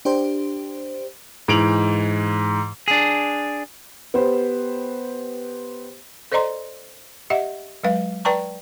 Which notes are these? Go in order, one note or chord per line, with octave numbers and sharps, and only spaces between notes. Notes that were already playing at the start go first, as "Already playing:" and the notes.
D4 G4 C5
G#2 E3 D7 F7 F#7
D4 G#4
B3 G4 B4 C5
A4 C5 D5 D#5 A#5 C6
G4 D#5 E5 F#5
F#3 G#3 B4 F5
B4 D5 G5 A5 A#5 C#6